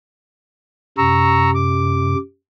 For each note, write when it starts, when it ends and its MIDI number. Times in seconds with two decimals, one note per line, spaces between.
0.98 2.15 42
0.98 2.15 48
0.98 1.51 82
0.98 1.51 85
0.98 1.51 88
1.55 2.18 86